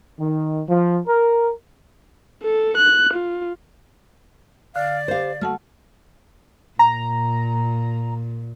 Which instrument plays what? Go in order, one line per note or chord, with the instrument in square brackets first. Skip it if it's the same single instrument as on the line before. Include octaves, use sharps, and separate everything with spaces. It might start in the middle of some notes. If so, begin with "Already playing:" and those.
[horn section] D#3
F3
A#4
[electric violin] A4
F#6
F4
[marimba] D3 [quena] D5 [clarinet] F5
[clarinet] G4 [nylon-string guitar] C5 F5
[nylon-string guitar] A3 [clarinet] F#4 [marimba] F#5 A5 F6
[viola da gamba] A#2 [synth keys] A#5